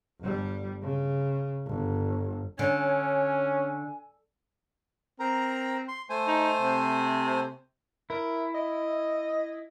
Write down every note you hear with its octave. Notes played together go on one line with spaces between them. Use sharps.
G1 G3
C#3
G1
D3 C#4 C#5 G#5
C4 A#4 A#5
C6
A3 C5 G#5
D#4
C3
E4 A#4
D#5